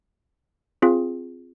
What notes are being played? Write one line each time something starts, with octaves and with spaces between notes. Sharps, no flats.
C4 F4 G#4